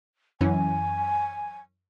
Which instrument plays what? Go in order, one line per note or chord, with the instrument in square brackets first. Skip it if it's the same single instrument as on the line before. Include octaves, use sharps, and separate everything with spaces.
[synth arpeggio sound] F#2 E3 C#4 [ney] G#5